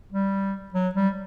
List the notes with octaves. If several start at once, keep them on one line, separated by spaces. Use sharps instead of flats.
G3
F#3
G3